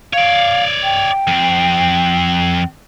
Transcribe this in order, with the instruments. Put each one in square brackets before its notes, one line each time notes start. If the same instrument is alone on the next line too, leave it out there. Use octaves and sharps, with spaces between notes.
[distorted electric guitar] C#5 D5 [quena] F5
[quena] G5
[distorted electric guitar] F2 C4